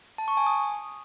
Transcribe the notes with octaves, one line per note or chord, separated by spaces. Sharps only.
A5
C#6
G#5
D#6